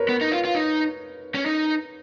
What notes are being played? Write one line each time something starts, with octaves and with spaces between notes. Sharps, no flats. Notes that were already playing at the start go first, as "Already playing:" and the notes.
Already playing: A#4 B4 C#5
B3
D#4
F4
F4
D#4
C#4
D#4